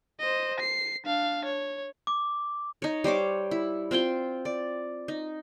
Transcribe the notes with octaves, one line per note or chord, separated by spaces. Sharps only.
C5 D#5
C7
D4 F5
C#5
D6
D#4 C#5
G3 C5 C#5 D6
E4
C4 F4 G5 C6
D5
D#4